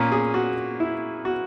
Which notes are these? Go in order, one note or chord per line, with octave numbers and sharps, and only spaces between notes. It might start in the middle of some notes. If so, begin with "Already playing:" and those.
Already playing: A#2 A#3 C#4
G#4
F#4
E4
F#4